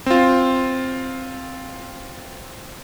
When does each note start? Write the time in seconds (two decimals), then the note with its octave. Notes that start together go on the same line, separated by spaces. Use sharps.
0.06 C4 F4